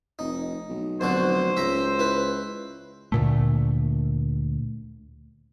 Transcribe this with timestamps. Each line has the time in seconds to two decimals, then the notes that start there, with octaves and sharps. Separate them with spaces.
0.19 F1 D#4
0.69 B1
1.01 F1 B1 D3 F#4 C5
1.57 C#2 E5 A#5
1.99 E4 B4
3.12 D2 A#2 A3